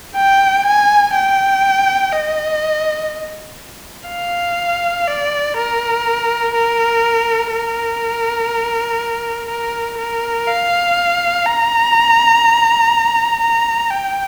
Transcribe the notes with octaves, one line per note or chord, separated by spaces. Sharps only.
G5
G#5
G5
D#5
F5
D5
A#4
A#4
A#4
A#4
A#4
F5
A#5
A#5
G5